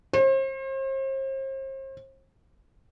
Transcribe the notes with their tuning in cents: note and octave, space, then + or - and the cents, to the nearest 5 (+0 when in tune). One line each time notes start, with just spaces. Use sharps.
C5 +40